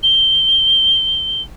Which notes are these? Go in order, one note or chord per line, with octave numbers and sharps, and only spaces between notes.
G7